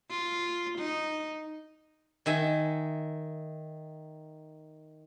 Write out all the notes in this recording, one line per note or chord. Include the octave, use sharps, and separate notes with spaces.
F4
D#4
D#3 E5 G#5